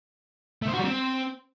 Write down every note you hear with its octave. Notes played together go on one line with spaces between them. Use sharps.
A3
C5
F#4
G3
C4